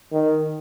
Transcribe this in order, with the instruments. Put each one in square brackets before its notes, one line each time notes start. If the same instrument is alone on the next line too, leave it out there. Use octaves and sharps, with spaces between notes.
[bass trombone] D#3